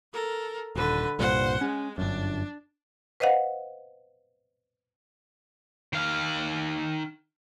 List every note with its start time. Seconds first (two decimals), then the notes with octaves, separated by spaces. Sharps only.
0.13 A4 A#4
0.76 D#1 D3 B4
1.19 C2 G2 A#2 C5 F#5
1.61 G#3 C#4
1.98 G1 F#2 D4
3.20 B4 C5 D#5 F5 F#5
5.93 D#3 F5